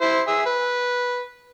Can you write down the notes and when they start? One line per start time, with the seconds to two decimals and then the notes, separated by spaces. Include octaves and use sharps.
0.01 E4 C5
0.27 G#4 E5
0.46 B4